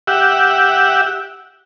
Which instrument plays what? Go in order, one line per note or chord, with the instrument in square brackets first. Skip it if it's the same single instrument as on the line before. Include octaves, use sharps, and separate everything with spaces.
[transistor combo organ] G4 E5 F#5